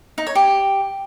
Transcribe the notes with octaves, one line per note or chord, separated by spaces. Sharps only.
D#4
C#5
G4